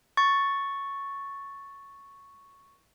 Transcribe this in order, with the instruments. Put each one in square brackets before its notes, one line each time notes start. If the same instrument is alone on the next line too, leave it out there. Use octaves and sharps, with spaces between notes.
[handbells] C#6 A6